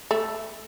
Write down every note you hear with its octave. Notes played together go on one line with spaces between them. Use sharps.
A3